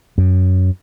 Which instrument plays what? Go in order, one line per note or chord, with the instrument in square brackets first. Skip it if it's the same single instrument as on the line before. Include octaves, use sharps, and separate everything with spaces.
[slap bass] F#2